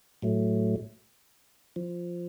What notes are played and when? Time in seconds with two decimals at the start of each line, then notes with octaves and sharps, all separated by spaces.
0.22 A2 F#3 A3
1.76 F3